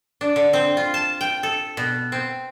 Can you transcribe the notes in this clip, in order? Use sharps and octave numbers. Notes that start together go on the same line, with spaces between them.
D4
D3
C4
F4
A5
G5
A4
B2
C4